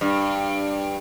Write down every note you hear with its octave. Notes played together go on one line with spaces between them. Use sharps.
G2